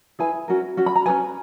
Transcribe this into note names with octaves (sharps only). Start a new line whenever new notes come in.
E4 G#4 B4 G#5
C#4 F#4 A#4
C#4 F#4
B5
A#5
C#4 G#4 B4 G#5